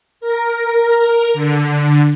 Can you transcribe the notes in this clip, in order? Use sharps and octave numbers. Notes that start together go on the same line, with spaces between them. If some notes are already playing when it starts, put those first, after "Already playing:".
A#4
D3